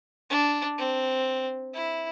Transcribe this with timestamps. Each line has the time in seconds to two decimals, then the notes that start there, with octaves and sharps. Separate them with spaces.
0.30 D4
0.78 C4
1.74 E4